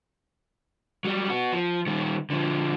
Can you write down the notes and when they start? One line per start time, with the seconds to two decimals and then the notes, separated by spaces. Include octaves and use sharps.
1.05 F#3 G3
1.30 B3 F#4
1.52 F3
1.87 D#3 G3
2.30 D3 F3